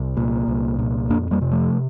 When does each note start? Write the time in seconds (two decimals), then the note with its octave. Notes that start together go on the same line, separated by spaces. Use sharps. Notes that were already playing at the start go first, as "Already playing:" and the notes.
Already playing: C2
0.17 A#2
0.48 C2
0.79 A#2
1.10 F2 A#3 D4
1.31 G3 A#3
1.41 C3
1.51 F3 A3